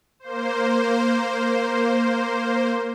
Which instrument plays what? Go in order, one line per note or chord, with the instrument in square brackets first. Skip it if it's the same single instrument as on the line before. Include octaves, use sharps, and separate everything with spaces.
[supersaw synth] A#3 C5